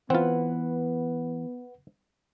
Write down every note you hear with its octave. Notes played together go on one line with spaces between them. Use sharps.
E3 B3 C4 F4 B4 F#5